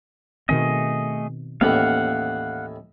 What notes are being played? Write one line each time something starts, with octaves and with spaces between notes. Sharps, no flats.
B2 D#3 A3 C4 G#4 D#5
D#2 A2 E3 A#3 B3 C#4 F5 F#5